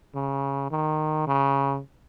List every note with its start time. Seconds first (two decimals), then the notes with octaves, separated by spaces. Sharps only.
0.15 C#3
0.71 D#3
1.27 C#3